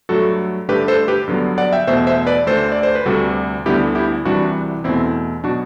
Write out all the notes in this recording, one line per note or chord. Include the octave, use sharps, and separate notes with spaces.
G2 F#3 A3 F#4 A4
G2 D3 A3 G4 B4
A4 C5
G4 B4
G2 D3 F#3 B3
D5 F#5
E5 G5
E2 B2 A3 C5 E5
C5 E5
B4 D5
D2 D3 A3 A4 C5
D5
C5
B4
D2 C3 G3 F#4 A4
D2 D3 G3 B3 E4 G4
E4 G4
C2 C3 E3 G3 D4 F#4
E2 B2 A3 C4 E4
B2 F#3 B3 D4 F#4